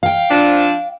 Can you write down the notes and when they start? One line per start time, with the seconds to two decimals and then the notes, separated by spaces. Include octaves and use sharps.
0.03 F5 G5
0.30 F3 C4 D4